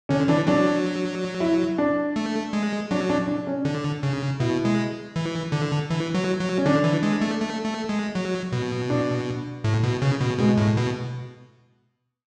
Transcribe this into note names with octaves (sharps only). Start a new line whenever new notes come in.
D3 C#4
E3 D4
F#3 D4
E4
D4
A3
G#3
F#3 D4
D4
D4
C#4
D3 D4
C#3
B2 E4
G#3
E3
D3
E3
F#3
F#3
C#4
D3 D4
E3
G#3
A3
A3
A3
G#3
F#3
B2
D4
A2
B2
C#3
B2
B2 G#3
A2
B2